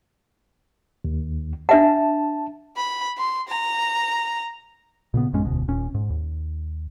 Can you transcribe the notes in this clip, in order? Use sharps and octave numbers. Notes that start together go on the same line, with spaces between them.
D#2
D4 E5 F#5 A5
B5
C6
A#5
A#2 C#3 B3
A1 F#2 G#3 C#4
E1 D2 B2
D#1 A#2 C#4
G#2
D#2